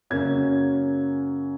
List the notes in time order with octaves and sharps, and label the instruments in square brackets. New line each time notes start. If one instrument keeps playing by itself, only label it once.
[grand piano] F#2 C#3 F#3 A#3 C#4 G#6